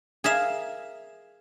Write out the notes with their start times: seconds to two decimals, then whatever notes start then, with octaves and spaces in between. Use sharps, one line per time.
0.24 G#4 A#4 E5 F5